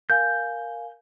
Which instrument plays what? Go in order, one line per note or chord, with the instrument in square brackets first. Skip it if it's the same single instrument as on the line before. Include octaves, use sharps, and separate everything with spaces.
[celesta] A#4 F5 G#5 [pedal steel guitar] G6